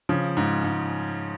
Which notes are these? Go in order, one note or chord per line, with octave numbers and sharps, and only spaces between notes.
C#3 F3
G#2
G#2